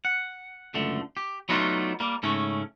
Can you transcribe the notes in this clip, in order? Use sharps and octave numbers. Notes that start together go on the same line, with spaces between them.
F#5
C#2 F#2 D3 A3
G4
F#3 A3 B3 D4 D#4 F4
G3 A#3
G#2 C#3 A3 C#4